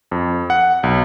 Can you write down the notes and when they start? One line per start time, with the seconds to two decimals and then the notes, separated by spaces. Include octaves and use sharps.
0.11 F2
0.50 F#5
0.83 B1